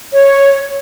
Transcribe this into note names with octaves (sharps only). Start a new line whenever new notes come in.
C#5